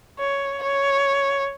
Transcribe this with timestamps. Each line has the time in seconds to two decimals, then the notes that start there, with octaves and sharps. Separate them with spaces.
0.19 C#5
0.63 C#5